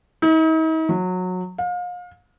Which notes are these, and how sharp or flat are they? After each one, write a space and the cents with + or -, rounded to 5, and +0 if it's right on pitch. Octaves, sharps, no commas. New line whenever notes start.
D#4 +45
F#3 -20
F5 +35